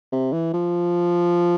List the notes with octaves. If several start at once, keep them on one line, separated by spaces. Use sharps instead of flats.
C3
E3
F3